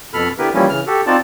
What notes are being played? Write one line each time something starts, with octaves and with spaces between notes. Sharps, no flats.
F2 B2 A4 B5 F6
D3 B3 E4 G4 A#4 B4
E3 F3 G3 A#3 C#4 E4
C#3 E3 F6
F#4 G4 A4
C4 D#4 F4 F#4 D5 A5